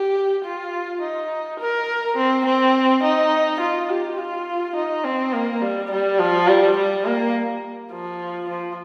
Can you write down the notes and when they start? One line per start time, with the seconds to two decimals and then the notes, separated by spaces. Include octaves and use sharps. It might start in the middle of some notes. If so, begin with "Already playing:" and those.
Already playing: G4
0.44 F4
1.01 D#4
1.59 A#4
2.16 C4
2.46 C4
3.03 D#4
3.60 F4
3.89 G4
4.18 F4
4.76 D#4
5.04 C4
5.33 A#3
5.62 G3
5.90 G3
6.19 F3
6.48 G3
6.77 G3
7.05 A#3
7.92 F3
8.49 F3